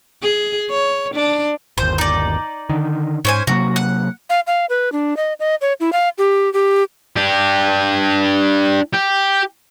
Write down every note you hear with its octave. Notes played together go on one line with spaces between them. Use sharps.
G#4
C#5
D4
G1 D#2 C5
D#4 D5
D3 D#3
G#2 C#4 C5 G#5
C3 F#3 A#3 F#4
F#5
F5
F5
B4
D4
D#5
D#5
C#5
E4
F5
G4
G4
D4 G4
G4